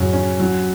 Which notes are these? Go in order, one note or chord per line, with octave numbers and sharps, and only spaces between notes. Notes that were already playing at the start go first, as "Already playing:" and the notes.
Already playing: F#2 A2 C#3 F#3 C#4
C#4
F#3